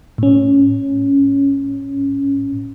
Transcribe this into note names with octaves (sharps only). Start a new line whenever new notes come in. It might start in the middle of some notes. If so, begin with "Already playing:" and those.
A2 C#4